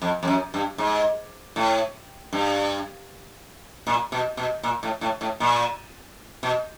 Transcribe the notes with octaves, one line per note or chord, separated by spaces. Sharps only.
F2
F2
F#2
G2
G#2
A2
G2
A#2
B2
B2
A#2
A2
A2
A2
A#2
B2